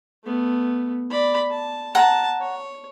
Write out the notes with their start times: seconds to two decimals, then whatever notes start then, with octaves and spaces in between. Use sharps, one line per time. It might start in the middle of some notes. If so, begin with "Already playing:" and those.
0.24 A3 B3
1.10 D5 B5
1.51 A5
1.95 F#5 A5 A#5
2.41 C#5